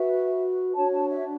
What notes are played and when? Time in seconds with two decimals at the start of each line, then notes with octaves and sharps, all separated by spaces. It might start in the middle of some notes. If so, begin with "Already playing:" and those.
Already playing: F#4 B4 E5
0.75 D4 F#4 C#5 A5
0.93 A5
1.11 E5